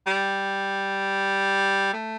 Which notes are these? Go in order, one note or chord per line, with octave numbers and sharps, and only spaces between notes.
G3
A3